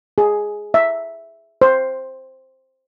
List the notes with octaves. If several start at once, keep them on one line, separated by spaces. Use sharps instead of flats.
G#4
E5
C5